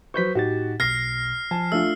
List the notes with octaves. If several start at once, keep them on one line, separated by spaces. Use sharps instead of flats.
F#3 B4 C5 C#6 G6 B6
A2 D#4 F#4 G4 A6
B1 B2 F6 A#6 C7
F3 G#5 A5
A3 D4 F4 E6